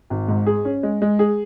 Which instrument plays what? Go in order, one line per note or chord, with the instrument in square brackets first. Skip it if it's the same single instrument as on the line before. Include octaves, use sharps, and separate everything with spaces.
[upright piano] G#1
G#2
G#4
C#4
G#3
G#3
G#4